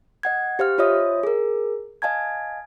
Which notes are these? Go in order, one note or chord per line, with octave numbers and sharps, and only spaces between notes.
D#5 F#5 G#6
G4 C5 F5 F6
F4 C5 C#5 D#5 E5 D#6
G#4 A#4
D#5 F5 G#5 A5 G#6